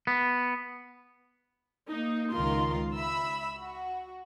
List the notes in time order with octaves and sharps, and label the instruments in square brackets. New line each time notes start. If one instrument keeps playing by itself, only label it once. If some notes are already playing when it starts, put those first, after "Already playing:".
[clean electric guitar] B3
[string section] A#3 D#4
C#2 D#3 F4 A#4 C6
E5 B5 E6
F#4